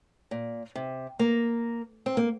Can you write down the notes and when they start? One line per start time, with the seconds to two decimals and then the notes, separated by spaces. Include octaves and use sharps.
0.31 A#2
0.76 C3
1.19 A#3
2.06 C4
2.17 A#3